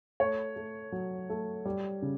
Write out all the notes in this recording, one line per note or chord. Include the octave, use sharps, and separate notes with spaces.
A3 C#5
A3
F#3
A3
G3
C#3